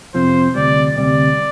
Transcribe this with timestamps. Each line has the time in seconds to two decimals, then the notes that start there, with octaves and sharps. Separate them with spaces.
0.14 F2 C3 F3 C4 F4 C5
0.55 D2 C3 G3 D5
0.96 D2 C3 G3 D5